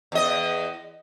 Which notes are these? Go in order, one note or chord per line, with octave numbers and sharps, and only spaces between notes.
E2 D#5